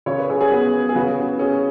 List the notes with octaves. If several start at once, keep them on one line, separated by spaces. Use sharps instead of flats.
C#3 C#5
B4
G#4 C#5
G#4
B3 F#4 B4
G#4
C#3 F#4 B4
F#4
C#4 G#4